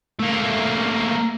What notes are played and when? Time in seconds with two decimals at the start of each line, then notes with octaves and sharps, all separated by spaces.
0.19 A3 A#3